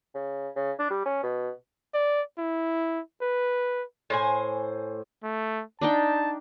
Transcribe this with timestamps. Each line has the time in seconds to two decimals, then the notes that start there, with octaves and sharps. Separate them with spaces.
0.15 C#3
0.56 C#3
0.79 D4
0.90 G3
1.05 C#4
1.23 B2
1.94 D5
2.38 E4
3.21 B4
4.10 A2 C5 G#5
5.24 A3
5.81 D4 D#4 G5 A5